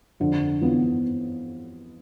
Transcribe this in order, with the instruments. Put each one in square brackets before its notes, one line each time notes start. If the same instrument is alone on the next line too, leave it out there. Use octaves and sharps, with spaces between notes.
[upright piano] F2 [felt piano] D3
[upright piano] E3 B3 F4